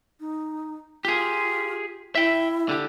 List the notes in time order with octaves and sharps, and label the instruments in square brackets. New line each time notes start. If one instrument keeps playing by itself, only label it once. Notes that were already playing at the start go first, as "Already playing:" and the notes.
[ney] D#4
[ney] F4 [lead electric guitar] G4 G#4
[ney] E4 [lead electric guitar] E5 G5
[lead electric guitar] D3 G4